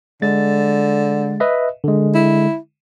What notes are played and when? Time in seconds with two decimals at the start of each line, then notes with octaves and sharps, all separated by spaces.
0.22 D3 G#3 A6
1.40 B4 D#5 E5
1.84 D3 G#3
2.15 E4